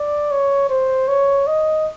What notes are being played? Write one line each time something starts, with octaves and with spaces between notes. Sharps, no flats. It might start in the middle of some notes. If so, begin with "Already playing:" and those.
Already playing: D5
C#5
C5
C#5
D#5